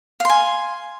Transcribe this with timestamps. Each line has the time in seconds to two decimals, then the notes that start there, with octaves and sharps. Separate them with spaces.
0.20 F5
0.25 C6
0.29 G#5